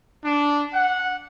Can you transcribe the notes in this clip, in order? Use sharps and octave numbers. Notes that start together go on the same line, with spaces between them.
D4
F#5